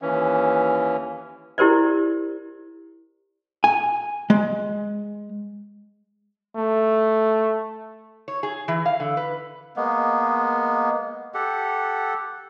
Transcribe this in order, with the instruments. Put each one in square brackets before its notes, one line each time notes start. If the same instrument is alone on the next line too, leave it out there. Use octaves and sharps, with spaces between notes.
[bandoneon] D#2 E3 C#4
[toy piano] E4 G4 A#4 C5 D5
[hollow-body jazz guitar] G#5
G#3
[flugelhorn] A3
[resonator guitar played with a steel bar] C#5
G#4
E3
F5
D3
B4
[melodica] G#3 A#3 B3
G4 A4 F#5